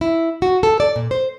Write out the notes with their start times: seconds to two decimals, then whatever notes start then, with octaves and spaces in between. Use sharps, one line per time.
0.01 E4
0.42 F#4
0.63 A4
0.80 D5
0.96 A#2
1.11 C5